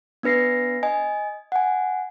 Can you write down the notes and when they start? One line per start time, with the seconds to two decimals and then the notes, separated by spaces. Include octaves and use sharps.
0.23 B3 D4 B4 A#6 C7
0.83 D#5 G#5
1.52 F#5 G#5